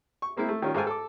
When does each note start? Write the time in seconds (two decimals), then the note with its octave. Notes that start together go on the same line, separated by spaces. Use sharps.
0.22 C#6
0.37 G#3 A#3 C4 E4
0.49 A3
0.62 D#3 G3 C#4 F4
0.74 G#2 A4 C5 F5 G5 G#5
0.87 A4 D6